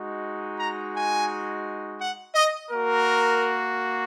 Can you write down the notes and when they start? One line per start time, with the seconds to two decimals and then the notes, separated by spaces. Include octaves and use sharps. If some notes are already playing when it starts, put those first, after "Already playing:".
Already playing: G#3 D#4 F#4
0.58 A#5
0.94 G#5
2.00 F#5
2.35 D#5
2.71 A#3 F#4 A#4